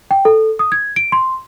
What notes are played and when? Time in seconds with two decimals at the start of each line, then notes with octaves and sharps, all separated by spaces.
0.11 G5
0.25 A4
0.59 D#6
0.72 G#6
0.96 D7
1.12 C6